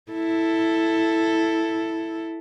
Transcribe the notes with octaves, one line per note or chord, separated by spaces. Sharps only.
E4 A4